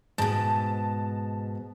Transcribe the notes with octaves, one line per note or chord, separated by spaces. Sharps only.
G#2 B2 A5